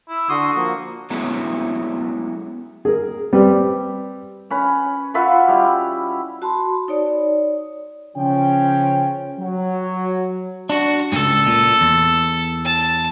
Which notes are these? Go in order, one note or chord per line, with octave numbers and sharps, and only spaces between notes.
E4
D3 F#4 C6 D#6
F3 A#3
F#3 G#3 A3 B3 C#4 E4
G#4 A#4
G3 C4 B4
C#4 B4
F4 F#4 B4 E5
G3 E4
F#4 A5 B5 C6
D#4 C#5 D5
C#3 F3 C#4 G5
F#3
D4 F#4
C#2 G#2 A4
A#2
E2
A5